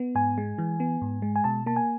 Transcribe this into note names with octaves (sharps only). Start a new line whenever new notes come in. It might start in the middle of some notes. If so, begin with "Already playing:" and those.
Already playing: B3
G#2 G#5
G#3
E3
B3
G#2
G#3
G#5
B2 A5
A#3 A5
G#5